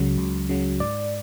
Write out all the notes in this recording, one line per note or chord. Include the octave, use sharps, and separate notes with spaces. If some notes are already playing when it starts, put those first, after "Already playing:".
Already playing: C#2 C#3 F#3
C#2
C#3 F#3
G#2 D5